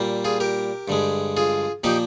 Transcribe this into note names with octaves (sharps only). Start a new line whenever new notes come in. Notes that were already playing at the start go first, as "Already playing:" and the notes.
Already playing: A#2 G3 A#3
F4 G#4
G4 A#4
G2 D3 G#3
F4 G#4
A#2 F3 A#3 D#4 G4